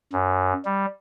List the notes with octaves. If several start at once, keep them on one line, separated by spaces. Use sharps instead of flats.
F#2
G3